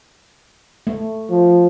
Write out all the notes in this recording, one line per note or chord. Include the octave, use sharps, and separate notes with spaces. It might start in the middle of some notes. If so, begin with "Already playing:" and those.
A3
F3